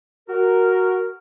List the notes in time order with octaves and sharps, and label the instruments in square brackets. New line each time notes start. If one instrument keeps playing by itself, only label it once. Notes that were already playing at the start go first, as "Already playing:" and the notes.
[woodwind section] F#4 A#4